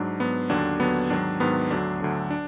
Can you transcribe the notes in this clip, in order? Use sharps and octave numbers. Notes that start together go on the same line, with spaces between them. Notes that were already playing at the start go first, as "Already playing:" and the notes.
Already playing: G#2 F#3 D4
G#2 F#3 B3
D#2 D3 F#3 D4
D#2 D3 F#3 B3
G#2 D#3 F#3 D4
G#2 D#3 F#3 B3
D2 D3 F#3 D4
D2 D3 F#3
D4